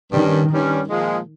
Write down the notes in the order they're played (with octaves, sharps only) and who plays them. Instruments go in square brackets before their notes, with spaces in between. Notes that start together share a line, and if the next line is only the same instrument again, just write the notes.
[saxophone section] G2 G3 C#4 [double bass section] D#3
[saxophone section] G2 G3 C#4
A#2 F3 G#3